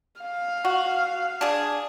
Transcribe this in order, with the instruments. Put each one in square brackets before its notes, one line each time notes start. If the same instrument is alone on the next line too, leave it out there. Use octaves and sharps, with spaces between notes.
[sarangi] F5
[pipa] F#4
D4 G#4